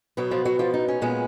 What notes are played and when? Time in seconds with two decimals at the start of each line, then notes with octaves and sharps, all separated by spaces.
0.17 B2 F#3 B3
0.31 F3 F4
0.45 F#3 F#4
0.59 F3 F4
0.74 D#4
0.88 C#4
1.01 A#2 G#3 B3